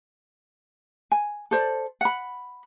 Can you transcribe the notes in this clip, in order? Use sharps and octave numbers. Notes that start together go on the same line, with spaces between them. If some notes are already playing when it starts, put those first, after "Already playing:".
G#5
A4 C5 D5
F#5 B5